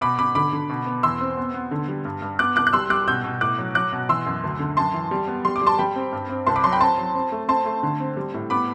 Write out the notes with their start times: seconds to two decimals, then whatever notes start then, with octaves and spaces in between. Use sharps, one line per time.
0.01 B2 B5 D6
0.19 B2 B5 D6
0.35 D3 B5 D6
0.53 D3
0.70 B2
0.86 B3
1.03 E2 C6 E6
1.21 C4
1.37 B3
1.54 B3
1.71 D3
1.88 G3
2.05 G2
2.22 G2
2.39 B3 D6 F#6
2.56 C2 D6 F#6
2.67 F#6
2.73 G3 C6 E6
2.90 G3 D6 F#6
3.07 B2 E6 G6
3.24 B2
3.41 A2 D6 F#6
3.59 F#3
3.75 F#3 D6 F#6
3.93 B2
4.09 E3 C6 E6
4.26 F#2
4.44 D2
4.59 D3
4.77 F#2 A5 C6
4.93 E3
5.11 G3
5.28 B3
5.45 G3 C6
5.56 D6
5.61 G3
5.67 A5 C6
5.79 G3 G5 B5
5.96 C4
6.13 G2
6.30 C4
6.47 C2 A5 C6
6.56 B5 D6
6.64 F#3 A5 C6
6.72 G5 B5
6.80 C4 A5 C6
6.98 F#3
7.14 C4
7.32 A3
7.49 C4 A5 C6
7.66 A3
7.83 D3
8.00 C4
8.17 G3
8.34 A2
8.50 B3 B5 D6